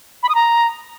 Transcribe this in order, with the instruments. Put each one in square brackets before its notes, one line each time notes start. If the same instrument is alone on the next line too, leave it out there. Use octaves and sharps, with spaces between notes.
[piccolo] B5
D#6
A#5